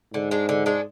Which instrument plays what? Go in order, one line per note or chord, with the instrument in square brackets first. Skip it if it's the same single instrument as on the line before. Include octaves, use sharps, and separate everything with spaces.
[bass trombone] G#2 [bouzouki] D3
[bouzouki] G#3 D4
D3
G#3 D4